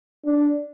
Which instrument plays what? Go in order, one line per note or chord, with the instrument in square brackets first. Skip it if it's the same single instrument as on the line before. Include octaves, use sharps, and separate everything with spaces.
[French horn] D4